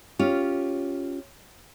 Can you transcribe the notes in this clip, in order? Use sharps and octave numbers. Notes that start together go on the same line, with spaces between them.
C#4 F4 G4